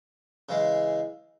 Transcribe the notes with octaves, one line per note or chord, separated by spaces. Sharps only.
C#3 E3 G#3